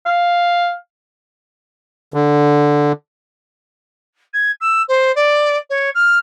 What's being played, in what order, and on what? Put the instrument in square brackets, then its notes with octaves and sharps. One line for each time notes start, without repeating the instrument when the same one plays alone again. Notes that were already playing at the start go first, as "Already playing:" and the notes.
[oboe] F5
[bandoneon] D3
[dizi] G#6
E6
C5
D5
C#5
F6